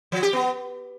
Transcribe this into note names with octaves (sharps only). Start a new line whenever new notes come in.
F3
G4
B3